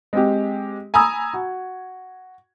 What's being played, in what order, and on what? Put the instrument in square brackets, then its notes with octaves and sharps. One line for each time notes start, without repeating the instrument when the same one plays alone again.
[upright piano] G#3 C4 G4
G#5 A#5 B5 D#6 E6 G#6
F#4